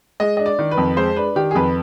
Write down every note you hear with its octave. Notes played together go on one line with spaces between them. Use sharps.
G#3 D#5
D4 D#5
D5
D#3
B4
F2
G#3 C5
D4 B4
D#3 G4
G#4
F2 B4